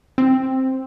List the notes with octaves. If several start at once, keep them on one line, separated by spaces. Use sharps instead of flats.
C4